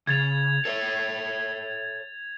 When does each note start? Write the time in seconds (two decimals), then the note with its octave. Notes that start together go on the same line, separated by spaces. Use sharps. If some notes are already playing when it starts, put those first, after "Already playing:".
0.07 C#3 G#6 A6 F7
0.65 A4 C#5 E5